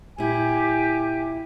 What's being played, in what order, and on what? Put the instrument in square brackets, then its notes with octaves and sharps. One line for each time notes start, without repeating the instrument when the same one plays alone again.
[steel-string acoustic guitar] A#2 E4 [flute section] G4 G#5